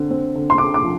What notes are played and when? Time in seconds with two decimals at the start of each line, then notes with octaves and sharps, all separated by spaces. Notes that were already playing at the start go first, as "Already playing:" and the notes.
Already playing: D3 C4
0.10 C4
0.35 D3
0.50 C6
0.58 D3 D6
0.74 D6
0.83 F3